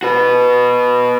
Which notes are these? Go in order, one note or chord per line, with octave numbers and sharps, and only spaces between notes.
F#4 B4